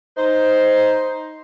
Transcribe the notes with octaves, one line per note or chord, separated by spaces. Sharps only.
D#4 C5